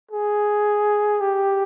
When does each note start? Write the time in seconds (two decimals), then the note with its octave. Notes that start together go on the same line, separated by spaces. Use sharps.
0.11 G#4
1.21 G4